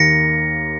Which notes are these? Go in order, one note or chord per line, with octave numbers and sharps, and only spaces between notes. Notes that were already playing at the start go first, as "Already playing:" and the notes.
Already playing: D#2 D#3 A#3 A#6 C#7